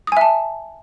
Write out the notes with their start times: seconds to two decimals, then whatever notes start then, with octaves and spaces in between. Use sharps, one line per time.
0.07 D#6
0.12 G#5
0.17 E5
0.21 A5